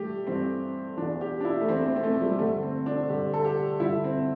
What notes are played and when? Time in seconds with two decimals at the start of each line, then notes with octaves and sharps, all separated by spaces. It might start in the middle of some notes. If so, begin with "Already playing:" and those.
Already playing: G2 E3 A3 G4
0.27 G2 E3 C4
0.97 E3 D4
1.02 E2
1.21 G4
1.41 D4
1.45 E4
1.61 A3
1.68 E3 C4
1.72 E2
1.86 C4
1.96 C4
2.03 A3
2.21 G3
2.39 G2 D3 A3
2.63 C4
2.86 D4
3.09 G2 D3 G4
3.34 A4
3.45 G4
3.80 G2 D3 E4
4.04 C4